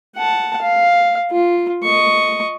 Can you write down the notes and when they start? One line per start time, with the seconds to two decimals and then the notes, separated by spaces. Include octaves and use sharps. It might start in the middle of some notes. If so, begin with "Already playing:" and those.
0.16 F#5 A5
0.62 F5
1.31 F4
1.83 D#5 C#6